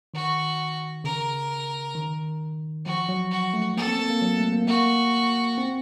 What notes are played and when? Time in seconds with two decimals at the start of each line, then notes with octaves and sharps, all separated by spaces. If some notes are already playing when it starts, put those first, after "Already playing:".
0.14 D#3 F#4
1.04 C#3 A#4
1.95 D#3
2.86 F3 F#4
3.09 F#3
3.31 F#4
3.54 A3
3.77 A#3 A4
3.87 C4
4.00 A#3
4.10 A#3
4.22 F#3
4.37 A3
4.53 A#3
4.67 A#3 F#4
5.58 C4